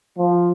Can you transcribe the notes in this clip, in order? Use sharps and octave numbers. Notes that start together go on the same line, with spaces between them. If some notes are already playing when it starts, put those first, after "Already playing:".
F3